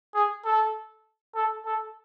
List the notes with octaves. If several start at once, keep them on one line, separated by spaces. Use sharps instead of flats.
G#4
A4
A4
A4